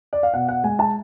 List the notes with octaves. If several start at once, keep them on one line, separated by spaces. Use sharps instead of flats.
D5
F5
B2 F#5
F#5
G#3 G#5
A5